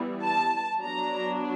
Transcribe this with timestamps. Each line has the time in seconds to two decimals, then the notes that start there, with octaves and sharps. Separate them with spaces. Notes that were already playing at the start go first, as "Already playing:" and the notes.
Already playing: E3 G3 B3
0.24 A5
0.80 F#3 B3 D4 A#5